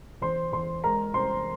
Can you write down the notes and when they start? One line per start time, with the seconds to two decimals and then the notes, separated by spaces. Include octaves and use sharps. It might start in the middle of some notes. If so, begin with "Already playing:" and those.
0.22 E2 C5 C6
0.52 E2 C5 C6
0.83 G#3 A#4 A#5
1.14 C2 C5 C6